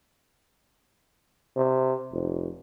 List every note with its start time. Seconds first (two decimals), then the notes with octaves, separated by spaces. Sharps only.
1.56 C3
2.12 F1